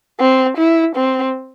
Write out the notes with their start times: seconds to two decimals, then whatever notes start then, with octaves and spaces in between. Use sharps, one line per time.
0.20 C4
0.57 E4
0.96 C4